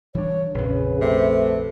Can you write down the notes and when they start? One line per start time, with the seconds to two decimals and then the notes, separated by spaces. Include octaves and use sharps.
0.15 E3 G3 D4 C#5
0.55 A#1 F2 C#3 B4
1.01 C3 A3